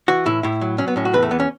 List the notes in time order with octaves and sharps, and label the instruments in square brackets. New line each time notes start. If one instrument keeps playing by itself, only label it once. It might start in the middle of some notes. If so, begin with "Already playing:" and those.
[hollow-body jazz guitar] E3 F#4
A2 E4
A2 E4
F#3
F#3 C#4
B3
A2 C#4
F#4
E2 B4
A3
E3 B3
C#4